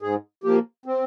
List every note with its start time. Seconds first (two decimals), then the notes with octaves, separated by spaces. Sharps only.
0.01 G#2 G#4
0.44 F3 A#3 G4
0.86 C4